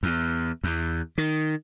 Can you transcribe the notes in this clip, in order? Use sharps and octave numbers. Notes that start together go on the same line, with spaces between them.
E2
E2
D#3